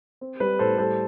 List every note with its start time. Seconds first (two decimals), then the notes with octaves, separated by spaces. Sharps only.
0.21 C4
0.40 G3 B4
0.59 A2 A4 C5
0.78 G3 A4 C5